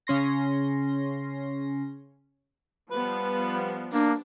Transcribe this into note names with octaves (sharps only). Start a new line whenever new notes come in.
C#3 C#4 C6 A#6
F3 G3 B3 B4
A#3 D4